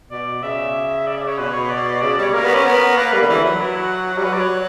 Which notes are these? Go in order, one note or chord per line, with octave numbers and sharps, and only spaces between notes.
B2 D5
C#3 E5
D5
D5
C#5
B2 B4
C#5
D5
C#3 D5
D5
G3
C#5
A#3 A#4
B3
C#4
B3
A#3 B4
G3
D3
E3
F#3
E4
F#4
G3
F#3 B4
D5
C#5